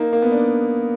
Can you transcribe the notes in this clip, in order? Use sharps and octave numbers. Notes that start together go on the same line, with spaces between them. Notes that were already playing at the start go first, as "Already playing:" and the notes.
Already playing: A#3 D#4
A#3
B3
D4